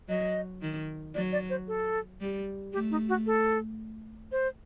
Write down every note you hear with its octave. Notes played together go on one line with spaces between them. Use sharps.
F#3 D#5
D#3
F#3 D5
D5
C5
A4
G3
A3 G4
D#4
F#4
A4
C5